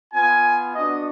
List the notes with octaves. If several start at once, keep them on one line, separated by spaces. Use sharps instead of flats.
B3 F4 G#5
B3 D4 F#4 D#5